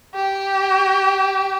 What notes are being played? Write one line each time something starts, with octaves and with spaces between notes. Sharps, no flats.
G4